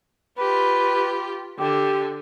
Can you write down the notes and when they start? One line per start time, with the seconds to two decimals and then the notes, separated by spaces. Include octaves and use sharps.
0.38 F4 G4 B4
1.59 D3 G4